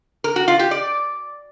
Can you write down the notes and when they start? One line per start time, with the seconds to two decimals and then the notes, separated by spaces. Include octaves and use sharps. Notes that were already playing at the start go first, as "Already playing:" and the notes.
0.24 A#4
0.36 F#4
0.48 F4
0.59 G4
0.71 D5